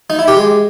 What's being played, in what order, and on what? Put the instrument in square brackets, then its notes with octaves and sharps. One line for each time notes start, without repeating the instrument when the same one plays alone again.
[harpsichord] D#4
E4
G4
G#3